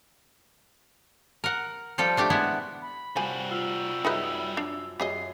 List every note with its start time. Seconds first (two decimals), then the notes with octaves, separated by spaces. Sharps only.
1.44 A#4 F#5
1.98 F3 G3 A4 G5
2.17 A3 D4 G4
2.30 G#3 B3 E4 F#4
2.82 B5
3.16 C3 F3 G3 F#4 G#5
3.51 F4 E6
4.05 F#2 D#4 G#4 B4 E5
4.57 D4
5.00 F#2 G4 G#4 D#5 C7